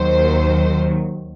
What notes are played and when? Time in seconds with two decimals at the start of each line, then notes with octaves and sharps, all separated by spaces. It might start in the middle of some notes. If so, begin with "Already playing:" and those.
Already playing: D#2 D#3 F#3 C5